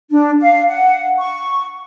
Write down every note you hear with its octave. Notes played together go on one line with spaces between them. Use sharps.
D4
F5
F#5
C#6